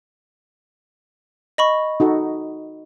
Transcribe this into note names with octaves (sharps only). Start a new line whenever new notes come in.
D#5 B5 C#6
D#4 F#4 A4